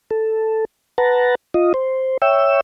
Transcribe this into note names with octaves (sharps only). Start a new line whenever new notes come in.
A4
B4 F#5 A5 A#5
F4 D#5
C5
C#5 E5 G5 E6